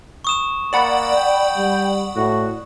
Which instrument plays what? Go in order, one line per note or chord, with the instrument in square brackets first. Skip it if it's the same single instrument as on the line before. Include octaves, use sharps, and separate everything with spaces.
[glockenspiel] C#6 D#6 E7
[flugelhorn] A#3 [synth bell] D5 F#5 B5
[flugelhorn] G5
[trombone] G3
[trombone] A2 [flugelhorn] F#4